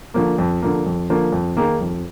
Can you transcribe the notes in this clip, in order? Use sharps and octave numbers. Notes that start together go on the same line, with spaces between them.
D3 F3 A#3
F2
D3 F3 A#3
F2
D3 F3 A#3
F2
D#3 A#3 D#4 G#4
F2